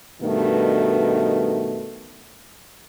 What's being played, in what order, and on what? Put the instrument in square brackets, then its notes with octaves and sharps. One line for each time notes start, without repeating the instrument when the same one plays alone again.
[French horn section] G2 B2 D#3 A3